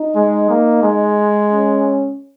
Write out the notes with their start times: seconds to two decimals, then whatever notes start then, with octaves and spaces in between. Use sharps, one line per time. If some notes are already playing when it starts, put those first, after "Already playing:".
Already playing: D#4
0.15 G#3
0.50 A#3
0.83 G#3
1.52 C#4